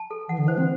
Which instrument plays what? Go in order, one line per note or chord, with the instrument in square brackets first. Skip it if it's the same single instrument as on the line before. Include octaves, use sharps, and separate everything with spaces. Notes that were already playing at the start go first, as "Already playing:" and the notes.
Already playing: [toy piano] A5
A4
[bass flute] E3 [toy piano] F#5
[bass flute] D3
[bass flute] E3 [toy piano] C5
[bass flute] C4